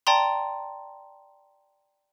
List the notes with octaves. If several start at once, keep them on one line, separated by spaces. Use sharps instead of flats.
D5 G5 A5 A#5 C6